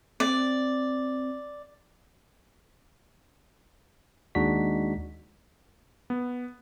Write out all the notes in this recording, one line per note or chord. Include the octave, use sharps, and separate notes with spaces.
C4 D5
D#2 G#3 D4 D#4 F#4 B6
B3